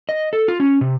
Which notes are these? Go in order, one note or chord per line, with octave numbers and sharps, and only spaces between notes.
D#5
A4
F4
C#4
C3